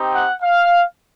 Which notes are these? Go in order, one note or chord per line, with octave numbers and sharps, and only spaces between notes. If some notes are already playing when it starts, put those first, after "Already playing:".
Already playing: C4 D#4 G4
F#5
F5